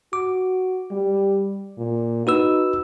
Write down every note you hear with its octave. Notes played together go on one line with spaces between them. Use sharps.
F#4 D6
G3
A#2
D#4 F#4 B4 E6